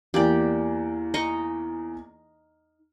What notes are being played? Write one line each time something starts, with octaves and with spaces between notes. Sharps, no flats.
E2 E3 A#3 G4 D5
D#4 D#5 C#6